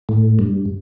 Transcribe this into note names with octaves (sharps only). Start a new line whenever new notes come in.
A2
G2